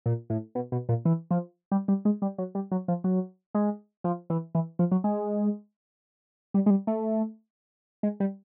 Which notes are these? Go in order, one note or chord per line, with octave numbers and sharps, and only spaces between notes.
A#2
A2
B2
B2
A#2
E3
F3
G3
G3
G#3
G3
F#3
G3
F#3
F3
F#3
G#3
F3
E3
E3
F3
F#3
G#3
G3
G#3
G3
A3
G#3
G3